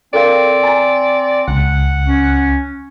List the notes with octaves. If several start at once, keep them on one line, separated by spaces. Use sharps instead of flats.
C4 A4 A#4 D5 F5
G#5 A#5 A6
C#2 F#5
C#4